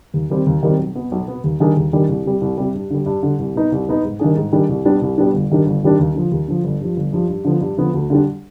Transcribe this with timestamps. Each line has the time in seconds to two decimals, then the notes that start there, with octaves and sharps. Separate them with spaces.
0.14 D#2
0.30 D#3 G3 C4
0.46 D#2
0.63 D#3 G3 C4
0.79 B1
0.95 B2 B3
1.12 B1
1.28 B2 B3
1.44 D#2
1.60 D#3 G3 D4 G#4
1.77 D#2
1.93 D#3 G3 D4 G#4
2.09 C2
2.25 C3 G3
2.41 C2
2.58 C3 G3
2.74 G2
2.90 D3 G3
3.06 G2
3.23 D3 G3
3.39 C2
3.55 B2 B3 D#4 B4
3.72 C2
3.87 B2 B3 D#4 B4
4.04 G#2
4.19 D#3 G3 D4 G#4
4.37 G#2
4.52 D#3 G3 D4 G#4
4.69 C2
4.85 B2 G3 B3 D4
5.01 C2
5.18 B2 G3 B3 D4
5.34 G1
5.50 G2 D#3 G3 D4
5.66 G1
5.83 G2 D#3 G3 D4
5.99 D#2
6.15 D3 F3
6.31 D#2
6.48 D3 F3
6.64 G1
6.80 G2 F3
6.96 G1
7.13 G2 F3
7.29 G2
7.45 D3 F3 B3
7.61 G2
7.78 D3 F3 B3
7.94 D2
8.10 D3 G3 D4